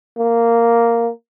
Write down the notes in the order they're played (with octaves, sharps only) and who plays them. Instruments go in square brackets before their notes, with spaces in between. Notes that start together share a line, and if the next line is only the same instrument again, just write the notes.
[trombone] A#3